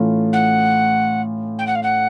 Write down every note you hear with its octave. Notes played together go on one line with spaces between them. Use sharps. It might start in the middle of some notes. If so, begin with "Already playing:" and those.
Already playing: A2 E3 A3 C#4 F4
F#5
G5
F#5
F5
F#5